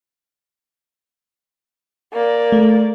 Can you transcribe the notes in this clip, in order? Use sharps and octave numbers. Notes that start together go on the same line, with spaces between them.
A#3 D5
A3